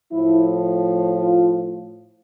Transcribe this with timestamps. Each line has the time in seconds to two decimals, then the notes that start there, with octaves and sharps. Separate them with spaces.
0.12 A2 F3 E4
1.13 F4